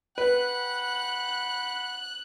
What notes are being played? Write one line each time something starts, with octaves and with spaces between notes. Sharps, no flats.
B4 F#5 G5 B5 F#6